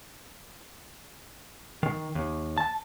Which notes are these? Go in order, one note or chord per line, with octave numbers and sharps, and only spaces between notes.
D#3
D#2
A5